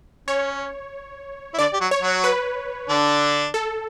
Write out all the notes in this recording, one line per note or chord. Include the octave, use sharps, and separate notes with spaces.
C#4 C#5
E4
D3 D4 D5
G4
F#3 F#4
C#5
F#3 F#4
B4
D3 D4
A4